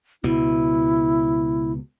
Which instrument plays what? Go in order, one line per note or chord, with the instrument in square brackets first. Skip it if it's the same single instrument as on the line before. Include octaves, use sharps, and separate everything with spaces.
[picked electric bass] C#2 B2 [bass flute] E4